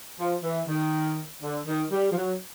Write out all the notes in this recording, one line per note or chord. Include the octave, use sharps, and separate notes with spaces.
F3
E3
D#3
D3
D#3
G3
F3
F#3